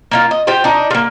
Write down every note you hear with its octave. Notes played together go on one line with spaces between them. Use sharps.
A#3 D#4 F4
D#5
F4 G4 C5 G5
D4 D#4
A#3 F4